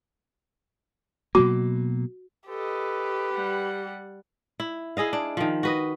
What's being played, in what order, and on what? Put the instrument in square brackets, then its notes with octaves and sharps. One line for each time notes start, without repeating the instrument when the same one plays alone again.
[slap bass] B2 F#3 A#3 [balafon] F#4
[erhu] G4 [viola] A4 D#5 [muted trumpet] B4
[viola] G3 F#5
[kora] E4
E4 G#4 D#5 F5
D4
D#3 F3
F#4 B4 D#5